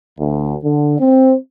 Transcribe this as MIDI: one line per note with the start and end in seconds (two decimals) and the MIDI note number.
0.19 0.55 38
0.63 0.96 50
0.99 1.36 60